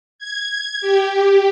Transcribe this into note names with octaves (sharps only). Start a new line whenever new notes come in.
G#6
G4